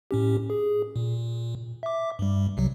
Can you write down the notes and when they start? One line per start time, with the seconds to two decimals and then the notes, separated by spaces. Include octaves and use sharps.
0.11 A2 C#4 G4
0.50 G#4
0.96 A#2
1.83 E5 D6
2.19 G2 G3
2.57 C2 C3 F#3